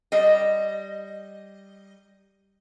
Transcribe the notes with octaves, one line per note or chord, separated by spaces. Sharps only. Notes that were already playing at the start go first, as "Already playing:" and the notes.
G3 D#5